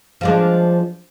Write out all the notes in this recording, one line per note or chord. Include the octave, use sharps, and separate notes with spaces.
F3 G#3 D4